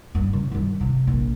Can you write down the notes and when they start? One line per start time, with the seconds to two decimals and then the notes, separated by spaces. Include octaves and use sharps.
0.15 G2
0.33 C#3
0.52 G2 D#3
0.80 C3
1.07 A#1